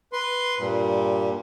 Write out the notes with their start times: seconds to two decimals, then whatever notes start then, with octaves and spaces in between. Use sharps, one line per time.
0.13 B4 C6
0.58 G2 A#2